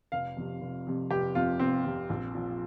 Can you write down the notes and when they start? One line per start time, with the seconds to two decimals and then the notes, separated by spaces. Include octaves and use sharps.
0.12 F1 F5
0.37 F2 C3
0.61 F1
0.87 F2 C3
1.11 F1 G4
1.35 F2 C3 F4
1.59 F1 C4
1.85 F2 C3
2.10 A#1
2.34 A#2 F3